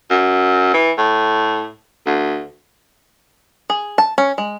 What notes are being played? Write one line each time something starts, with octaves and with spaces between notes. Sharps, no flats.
F#2
E3
A2
D2
G#4
A5
C#4
G#3